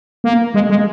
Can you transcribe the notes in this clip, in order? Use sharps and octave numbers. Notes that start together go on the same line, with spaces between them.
A#3
G#3
G#3